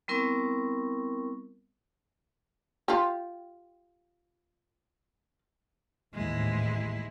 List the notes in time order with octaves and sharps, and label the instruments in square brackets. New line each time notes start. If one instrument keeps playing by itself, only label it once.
[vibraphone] G3 B3 C4 E4 A#4 C#6
[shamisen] F4 G4
[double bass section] A1 D#2 G#2 [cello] G#3 E4